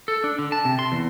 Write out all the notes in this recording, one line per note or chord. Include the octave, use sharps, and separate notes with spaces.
A4
D4
D3
A5
C3
C6
E2